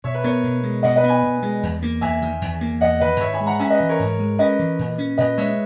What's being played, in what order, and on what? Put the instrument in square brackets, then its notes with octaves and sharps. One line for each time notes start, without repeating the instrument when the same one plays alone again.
[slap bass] B2 [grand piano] C#5 E5
[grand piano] B4
[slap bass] B3 [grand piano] A#4 C#5
[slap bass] B2
G#3
[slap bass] B2 [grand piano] D#5 F#5
[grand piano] B4 D#5
[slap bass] B3
[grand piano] G#5 B5
[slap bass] B2
G#3
E2
A#3
[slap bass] E2 [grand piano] E5 G#5
[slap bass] D#3
E2
A#3
[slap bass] E2 [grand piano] D#5 F#5
[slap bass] D#3 [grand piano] B4 D#5
[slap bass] G#2 [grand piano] C#5 E5
[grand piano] G#5 B5
[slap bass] G#3
[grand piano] F#5 A#5
[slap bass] C#4 [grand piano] E5 G#5
[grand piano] B4 D#5
[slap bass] E3
[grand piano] A#4 C#5
[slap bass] G#2
G#3
[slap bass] C#4 [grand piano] B4 D#5
[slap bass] E3
A#2
C#4
[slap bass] A#2 [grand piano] B4 D#5
[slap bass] G#3 [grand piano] C#5 E5